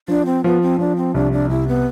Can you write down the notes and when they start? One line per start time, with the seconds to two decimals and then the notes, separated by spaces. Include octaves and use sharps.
0.08 F3 D4
0.26 C4
0.44 F3 B3
0.62 C4
0.79 F3 D4
0.96 C4
1.14 C2 D4
1.32 D4
1.50 C2 E4
1.68 B3